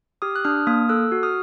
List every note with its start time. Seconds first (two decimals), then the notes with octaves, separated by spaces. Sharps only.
0.22 G4 D#6 F6
0.36 F#6
0.45 D4 D#6 F6
0.66 A#3 D#6 F6
0.89 A4 E6 F#6
1.12 F#4
1.23 D#6 F6